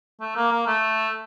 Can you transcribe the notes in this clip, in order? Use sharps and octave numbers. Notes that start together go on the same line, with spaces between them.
A3
A#3
A#3
A3